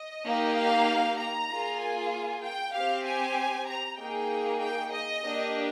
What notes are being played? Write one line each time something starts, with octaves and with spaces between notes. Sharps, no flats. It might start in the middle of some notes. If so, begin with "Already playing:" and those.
Already playing: D#5
A#3 D#4 G4
F5
A#5
A#3 F4 G#4
G#5
G5
C4 G4 F5
G#5
A#5
A#3 D#4 G#4 G5
G5
D#5
A#3 D4 G4